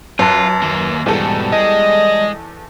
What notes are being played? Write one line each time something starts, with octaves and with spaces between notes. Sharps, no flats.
F#2 F4 B4 A5
D#2 A#3
E2 G#2 B2 G3 A4
G#3 D#5